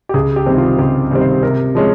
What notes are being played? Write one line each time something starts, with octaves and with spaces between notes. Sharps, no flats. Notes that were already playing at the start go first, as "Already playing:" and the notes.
G4
C#2 G#4
G4
C3 D#3 G3 C4
F4
C#2 G4
C3 D#3 G3 C4
C5
C3 A#4
F3 G#3 C#4